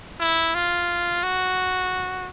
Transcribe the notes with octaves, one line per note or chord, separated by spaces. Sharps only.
E4
F4
F#4